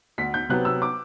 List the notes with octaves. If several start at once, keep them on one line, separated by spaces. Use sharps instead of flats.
D2 B6
G6
C3 F#3 B3 F#6
E6
D6